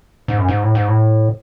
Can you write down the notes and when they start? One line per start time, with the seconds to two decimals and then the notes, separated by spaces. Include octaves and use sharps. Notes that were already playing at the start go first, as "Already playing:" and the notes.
0.28 G#2
0.38 F#2
0.49 G#2
0.64 A2
0.75 G#2
0.88 A2